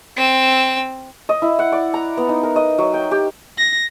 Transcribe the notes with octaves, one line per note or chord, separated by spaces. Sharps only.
C4 E6
D#5
E4
F#5
D5
A#5
B3
D#4
A#4
D#5
F#3
G5
G4
A#6